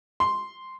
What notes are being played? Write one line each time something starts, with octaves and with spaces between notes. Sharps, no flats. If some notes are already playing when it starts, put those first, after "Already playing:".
C6